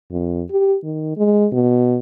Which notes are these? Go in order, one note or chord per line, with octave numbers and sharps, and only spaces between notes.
F2
G4
D#3
G#3
B2